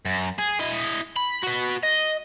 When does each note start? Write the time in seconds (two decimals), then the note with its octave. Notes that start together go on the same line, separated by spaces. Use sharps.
0.05 F#2
0.39 G#4
0.60 E4 D#5
1.16 B5
1.43 F#4 B4
1.83 D#5